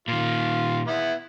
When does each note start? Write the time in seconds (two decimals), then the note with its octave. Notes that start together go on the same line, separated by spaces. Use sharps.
0.08 A#2 D#3 F4
0.88 B3 E4